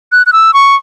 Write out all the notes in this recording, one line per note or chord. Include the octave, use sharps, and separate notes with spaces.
F#6
F#6
E6
C#6